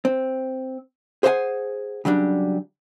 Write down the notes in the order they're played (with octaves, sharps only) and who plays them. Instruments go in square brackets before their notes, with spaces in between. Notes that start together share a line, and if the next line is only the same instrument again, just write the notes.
[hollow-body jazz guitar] C4
G#4 C5 C#5 E5 F#5 G#5
C#3 F#3 G3 D4